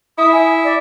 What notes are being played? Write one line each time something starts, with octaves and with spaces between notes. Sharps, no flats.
E4 D#6
G#5
D5